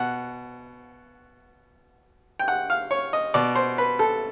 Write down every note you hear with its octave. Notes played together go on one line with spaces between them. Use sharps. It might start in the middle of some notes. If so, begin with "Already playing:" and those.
Already playing: B2 F#5
G5
F#5
F5
C#5
D#5
B2 D5
C5
B4
A4